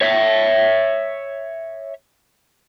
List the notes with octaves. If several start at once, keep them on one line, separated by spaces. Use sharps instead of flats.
C#5 E5